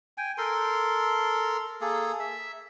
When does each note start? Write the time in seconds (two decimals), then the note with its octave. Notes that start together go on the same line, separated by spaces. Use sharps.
0.18 G5 G#5
0.38 A4 A#4 C6
1.81 A#3 G#4 A4
2.20 E5